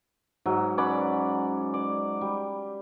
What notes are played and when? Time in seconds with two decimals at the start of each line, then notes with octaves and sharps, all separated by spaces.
0.46 G#2 F#3
0.78 C#4 D5 F#5 B5
1.74 D5
2.21 G3